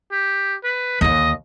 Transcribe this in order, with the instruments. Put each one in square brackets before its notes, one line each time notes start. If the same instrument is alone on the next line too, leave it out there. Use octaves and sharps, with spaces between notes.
[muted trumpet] G4
B4
[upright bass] D#2 D3 [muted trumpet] D#5